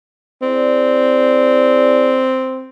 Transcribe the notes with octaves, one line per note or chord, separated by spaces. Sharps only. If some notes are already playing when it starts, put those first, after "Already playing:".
C4 E4 G#4 D5